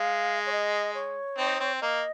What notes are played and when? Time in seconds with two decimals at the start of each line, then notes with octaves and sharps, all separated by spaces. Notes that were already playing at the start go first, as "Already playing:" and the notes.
Already playing: G#3 F5
0.46 C#5
0.52 D#5
0.95 C#5
1.38 C4 D#4
1.60 C4
1.81 A#3 D#5